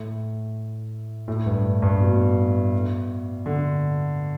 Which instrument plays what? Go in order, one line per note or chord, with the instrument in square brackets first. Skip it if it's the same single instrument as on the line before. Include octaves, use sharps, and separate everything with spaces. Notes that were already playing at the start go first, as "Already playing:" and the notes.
Already playing: [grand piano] A2
A2
G2
G2
B2
D3